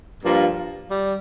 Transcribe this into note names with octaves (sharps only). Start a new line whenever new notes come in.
G2 F3 A#3
G3